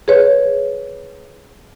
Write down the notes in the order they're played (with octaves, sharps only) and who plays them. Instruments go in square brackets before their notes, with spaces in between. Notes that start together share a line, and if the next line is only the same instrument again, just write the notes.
[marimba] G#4 B4 C#5